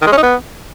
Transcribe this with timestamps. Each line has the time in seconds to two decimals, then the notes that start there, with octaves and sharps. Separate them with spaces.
0.02 D#3
0.07 G#3
0.12 C#4
0.17 D#4
0.23 B3